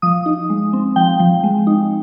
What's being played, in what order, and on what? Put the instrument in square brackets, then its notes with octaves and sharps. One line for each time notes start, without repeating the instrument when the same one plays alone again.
[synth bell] F3 D#6
D#4
G#3
C4
F3 G5
F3
G#3
D#4